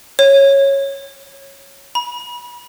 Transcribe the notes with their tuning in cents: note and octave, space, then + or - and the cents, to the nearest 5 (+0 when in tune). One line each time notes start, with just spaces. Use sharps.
C#5 -10
B5 -30